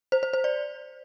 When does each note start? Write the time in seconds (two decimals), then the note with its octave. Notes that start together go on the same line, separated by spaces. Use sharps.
0.12 C5
0.23 C5
0.33 C5
0.44 D5